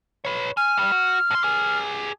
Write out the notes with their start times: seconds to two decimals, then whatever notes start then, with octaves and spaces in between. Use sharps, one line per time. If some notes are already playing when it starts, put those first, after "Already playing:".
0.25 B4 C#5
0.57 G#5 F6
0.78 G2 G3
0.92 F#4
1.31 A2 C6
1.43 G4 G#4